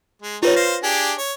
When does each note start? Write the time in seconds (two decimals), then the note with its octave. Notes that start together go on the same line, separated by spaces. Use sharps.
0.22 G#3
0.43 G3 D#4 F4 B4 C#5
0.56 C5 F5 A#6
0.83 D4 G4 G#4
1.18 C#5